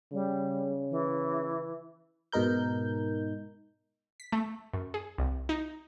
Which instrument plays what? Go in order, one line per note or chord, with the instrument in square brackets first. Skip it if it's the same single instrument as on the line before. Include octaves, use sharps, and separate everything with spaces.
[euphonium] C#3 [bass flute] G3
[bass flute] E3
[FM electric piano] G#2 B2 D#4 A#4 G6
[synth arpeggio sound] B6
A3
F#2
G#4
C2
D#4